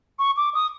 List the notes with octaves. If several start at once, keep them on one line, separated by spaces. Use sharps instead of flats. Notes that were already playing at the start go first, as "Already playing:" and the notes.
C#6
D6
D#6